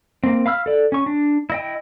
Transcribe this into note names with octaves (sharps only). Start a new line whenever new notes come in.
A#3 C4
F5 B5 E6 F6
A4 D5
C#4 C#6
D4
E4 D#5 G5